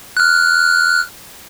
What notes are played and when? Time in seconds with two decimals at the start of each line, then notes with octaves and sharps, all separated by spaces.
0.17 F6 F#6